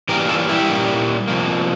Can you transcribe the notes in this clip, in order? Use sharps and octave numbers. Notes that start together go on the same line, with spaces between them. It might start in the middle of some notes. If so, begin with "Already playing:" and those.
E3 G3 A#3 G4 A#4
F4 A4
E4 G4
A#2 G3 A#3
C3 F3 A#3